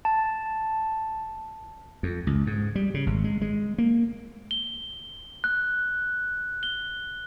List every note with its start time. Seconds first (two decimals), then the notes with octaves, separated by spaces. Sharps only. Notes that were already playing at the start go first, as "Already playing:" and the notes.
0.05 A5
2.03 F2
2.27 C#2
2.47 G#2
2.75 G3
2.94 C#3
3.07 G#1
3.24 G#3
3.42 G#3
3.78 A#3
4.51 G7
5.44 F#6
6.63 G7